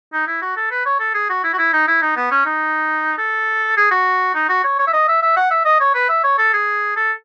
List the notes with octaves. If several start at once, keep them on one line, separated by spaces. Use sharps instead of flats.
D#4
E4
F#4
A4
B4
C#5
A4
G#4
F#4
E4
F#4
E4
D#4
E4
D#4
B3
C#4
D#4
A4
G#4
F#4
D#4
F#4
C#5
C#5
E5
D#5
E5
E5
F#5
E5
D#5
C#5
B4
E5
C#5
A4
G#4
A4